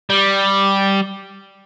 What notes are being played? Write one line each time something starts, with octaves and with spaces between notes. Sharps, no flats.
G3